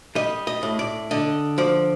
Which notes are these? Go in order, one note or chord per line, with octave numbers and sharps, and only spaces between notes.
G3 D#5
D#5
A2
D5
D3 D#5
F3 D5